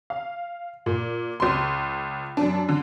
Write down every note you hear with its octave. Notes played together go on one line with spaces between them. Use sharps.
F5
A#2
C#2 C6
F#2 D4
D3